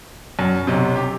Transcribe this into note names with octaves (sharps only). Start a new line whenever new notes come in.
F#2
B1 C3
G4